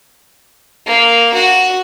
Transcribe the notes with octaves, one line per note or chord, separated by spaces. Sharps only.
A#3
F#4